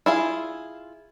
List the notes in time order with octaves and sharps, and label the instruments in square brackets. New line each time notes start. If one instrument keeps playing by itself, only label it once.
[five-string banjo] E4 F4 G#4